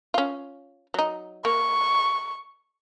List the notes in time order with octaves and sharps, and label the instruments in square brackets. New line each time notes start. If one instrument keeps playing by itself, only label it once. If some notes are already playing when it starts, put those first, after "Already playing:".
[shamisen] C#4 F4
F#3 D#4
[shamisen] A#3 [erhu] C#6